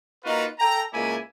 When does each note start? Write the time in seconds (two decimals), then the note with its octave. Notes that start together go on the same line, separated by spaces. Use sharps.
0.23 A#3 D#4 F4 F#4 B4
0.59 A4 G5 A#5
0.92 C#2 A#3 E4 D5 G#5